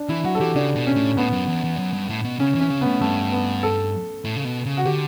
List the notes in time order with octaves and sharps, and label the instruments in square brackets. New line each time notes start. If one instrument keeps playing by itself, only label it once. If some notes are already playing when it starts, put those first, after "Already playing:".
Already playing: [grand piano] D4
[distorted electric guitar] E3 [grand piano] E4
[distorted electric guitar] F#3 [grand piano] F#4
[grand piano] A4
[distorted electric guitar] E3 [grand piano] G4
[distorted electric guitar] C#3 [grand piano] D4
[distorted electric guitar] B2
[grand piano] C#4
[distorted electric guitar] A2
[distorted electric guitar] A2 [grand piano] B3
[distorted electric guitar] F#2
E2
E2
F#2
G2
A2
B2
[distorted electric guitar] C#3 [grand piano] C#4
[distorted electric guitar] E3
[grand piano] C#4
[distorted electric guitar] C#3
[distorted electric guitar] A2 [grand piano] B3
[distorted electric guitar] G2 [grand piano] A3
[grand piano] B3
A4
[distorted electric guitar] A2
C#3
B2
C#3
[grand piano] F#4
[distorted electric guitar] D3 [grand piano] G4